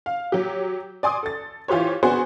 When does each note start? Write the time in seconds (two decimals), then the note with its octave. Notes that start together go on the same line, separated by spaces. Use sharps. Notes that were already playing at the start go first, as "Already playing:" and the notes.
0.06 F5
0.32 F#3 G4
1.03 D5 G#5 C6 D6 D#6
1.23 A4 A6
1.68 E3 F4 G4 C5 C#5
2.03 B3 D4 F#4 G#4 C5 F#5